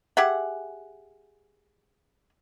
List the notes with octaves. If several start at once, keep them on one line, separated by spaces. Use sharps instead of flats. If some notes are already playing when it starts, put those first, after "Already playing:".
G4 G#4 E5 F#5